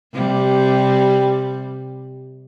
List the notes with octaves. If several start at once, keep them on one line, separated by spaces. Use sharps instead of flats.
C3 G3